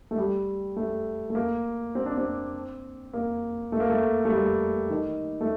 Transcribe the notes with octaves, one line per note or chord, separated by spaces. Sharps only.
A3
G3
A3
A3
A#3
C4
D4
C4
A#3
A3
A#3
A3
A3
G3
D#3
A3